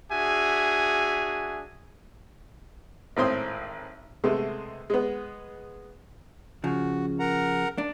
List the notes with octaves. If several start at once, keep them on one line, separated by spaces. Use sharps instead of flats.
D4 F#4 G#4 E5 G#5
G#1 A2 C4 C6 D#6
C3 G#3 A3 B3
G#3 B3
C#3 F3 F#4
A#4 F#5 A#5
D4